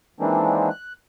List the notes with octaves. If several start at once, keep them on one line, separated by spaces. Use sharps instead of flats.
D#3 E3 G#3 A#3 C4 D4
F#6